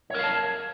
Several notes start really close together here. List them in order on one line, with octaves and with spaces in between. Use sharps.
C#5 A#4 F5 A5